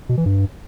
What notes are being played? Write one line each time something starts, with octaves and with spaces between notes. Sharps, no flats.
B2
E3
G2